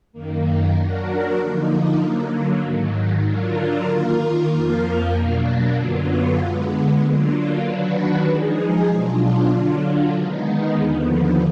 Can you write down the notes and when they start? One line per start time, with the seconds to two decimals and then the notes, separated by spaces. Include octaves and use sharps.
0.12 F#2 D#3 A#3
0.75 F#3 D4 F#4 A#4
1.37 D3 F3 A#3 D#4
2.00 D3 F#3 A#3
2.63 G#2 D#3 F#3
3.25 D3 F#3 D4 F4 A#4
3.88 D#3 A#3 F4 A#4
4.50 F2 F3 A#3 F4 A#4
5.13 B2 F#3 A#3 D4
5.76 F#2 D3 F#3 B3 F4
6.39 D3 G#3 B3
7.01 D3 F#3 A#3 D4 F4
7.63 D#3 F#3 D4 F#4 B4
8.26 F3 G#3 D#4 G#4
8.88 B2 F#3 D4 F4
9.51 D3 F#3 D4 F4
10.13 D#3 G#3 B3 D#4
10.76 D#2 D3 F3 B3